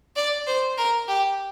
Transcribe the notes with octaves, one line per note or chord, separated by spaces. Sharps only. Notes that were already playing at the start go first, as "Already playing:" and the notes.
D5
C5
A#4
G4